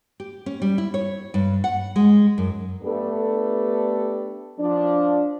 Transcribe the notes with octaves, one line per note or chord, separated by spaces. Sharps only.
G4
C#4
G3
E4
C#5
G2
F#5
G#3
F#2
A3 B3 D4 G4 A4
F3 D4